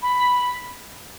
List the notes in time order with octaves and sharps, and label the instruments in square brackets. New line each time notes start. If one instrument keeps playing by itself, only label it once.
[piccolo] B5